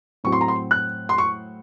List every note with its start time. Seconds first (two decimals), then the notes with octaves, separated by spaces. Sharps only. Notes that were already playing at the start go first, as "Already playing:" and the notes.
0.24 A2 F#3 C4 C#6
0.32 C6
0.41 A#5
0.48 C6
0.71 F#6
1.09 C6
1.18 C#6